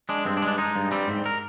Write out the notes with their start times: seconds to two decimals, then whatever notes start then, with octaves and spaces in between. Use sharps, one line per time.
0.09 G#3 D4
0.25 G2 C4
0.37 D4
0.42 G#3
0.48 D4
0.58 G#3 D#4
0.76 G2
0.91 G3 C4
1.08 G#2
1.26 A#4